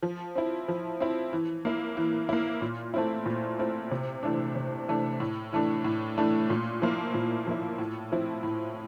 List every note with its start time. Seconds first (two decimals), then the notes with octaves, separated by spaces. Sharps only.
0.02 F3
0.35 C4 E4
0.68 F3
1.00 C4 E4
1.33 E3
1.65 A#3 E4
1.97 E3
2.29 A#3 E4
2.62 A#2
2.94 A3 C4 E4
3.26 A#2
3.59 A3 C4 E4
3.91 C3
4.23 E3 A3 D4
4.55 C3
4.88 E3 A3 D4
5.20 A2
5.53 E3 A3 D4
5.84 A2
6.18 E3 A3 D4
6.50 A#2
6.82 F3 A#3 E4
7.14 A#2
7.47 F3 A#3 E4
7.78 A2
8.12 F3 C4 E4
8.43 A2